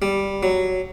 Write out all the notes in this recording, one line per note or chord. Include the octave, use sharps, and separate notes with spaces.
G3
F#3